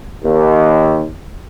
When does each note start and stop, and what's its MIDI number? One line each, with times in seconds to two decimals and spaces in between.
0.24 1.05 39